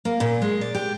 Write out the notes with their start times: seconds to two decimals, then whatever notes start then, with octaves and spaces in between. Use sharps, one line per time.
0.05 A#3
0.20 A#2
0.42 G#3
0.61 D5
0.75 G4